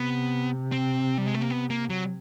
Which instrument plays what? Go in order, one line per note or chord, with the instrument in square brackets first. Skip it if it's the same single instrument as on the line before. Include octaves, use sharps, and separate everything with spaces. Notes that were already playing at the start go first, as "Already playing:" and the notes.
Already playing: [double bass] C3 [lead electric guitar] B3
[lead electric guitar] C4
G3
G#3
A3
A#3
B3
A#3
F#3